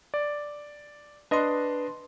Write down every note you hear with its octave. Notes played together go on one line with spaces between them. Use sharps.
D5
D4 B4 D#5 C6